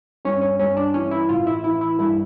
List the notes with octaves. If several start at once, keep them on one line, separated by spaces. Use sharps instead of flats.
G2 C#4
C#4
G2 C#4
D4
E3 C#4
E4
A1 F4
E4
E3 E4
E4
G2 E4